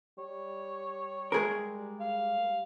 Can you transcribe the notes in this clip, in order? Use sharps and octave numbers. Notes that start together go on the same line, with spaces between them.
G3 C#5
G#3 G#4 A#4
F5